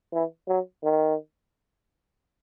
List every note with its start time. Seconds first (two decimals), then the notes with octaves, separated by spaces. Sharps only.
0.13 E3
0.48 F#3
0.83 D#3